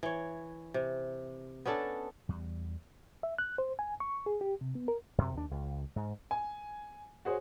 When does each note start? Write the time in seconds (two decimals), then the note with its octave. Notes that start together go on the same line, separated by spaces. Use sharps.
0.03 E3 C#5
0.74 C3
1.66 B3 C#4 D4 A4
2.29 E2 G3
3.23 E5
3.38 F#6
3.58 C5
3.79 G#5
4.00 C#6
4.26 G#4
4.41 G4
4.61 C3
4.75 B3
4.88 A#4
5.18 F#2 C3
5.34 D#2 D4
5.51 C#2
5.96 G#2
6.31 G#5
7.25 F#4 G#4 C5 C#5